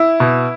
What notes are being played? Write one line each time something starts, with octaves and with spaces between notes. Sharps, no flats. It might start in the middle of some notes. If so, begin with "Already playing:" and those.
Already playing: E4
B2